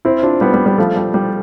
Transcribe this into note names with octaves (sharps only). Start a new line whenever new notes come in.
C4 E4
D4 F4
G3 B3
G3
G3
F3 A3
G3
G3